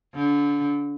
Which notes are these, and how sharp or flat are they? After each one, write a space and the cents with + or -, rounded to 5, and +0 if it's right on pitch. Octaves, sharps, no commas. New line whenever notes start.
D3 -30